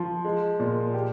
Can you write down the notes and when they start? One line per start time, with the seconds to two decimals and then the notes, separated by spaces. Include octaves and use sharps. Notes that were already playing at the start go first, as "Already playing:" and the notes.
Already playing: F3
0.25 G#3
0.59 A#2
0.94 G4